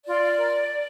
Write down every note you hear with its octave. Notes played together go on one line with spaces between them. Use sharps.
F4 D5
F4
A#4